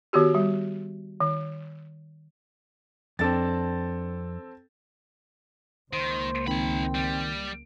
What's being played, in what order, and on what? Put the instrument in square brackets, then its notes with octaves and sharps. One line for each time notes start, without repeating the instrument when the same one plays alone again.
[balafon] D#3 B3 F#4 G4
G3
D#3
[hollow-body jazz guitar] F2 D4 [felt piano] C4 A4 A6
[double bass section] C#2 A#3 [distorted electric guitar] D#3 [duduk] C5
[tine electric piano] D#3 [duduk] C4 [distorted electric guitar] D#4 B5
[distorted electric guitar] G3